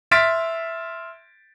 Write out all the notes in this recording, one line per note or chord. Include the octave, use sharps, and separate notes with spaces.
E5 C6 F6 A6 B6 D7